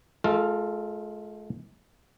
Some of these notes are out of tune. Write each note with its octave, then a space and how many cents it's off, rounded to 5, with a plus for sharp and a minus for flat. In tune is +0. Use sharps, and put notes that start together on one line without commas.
G#3 +45 F4 +0 A4 +25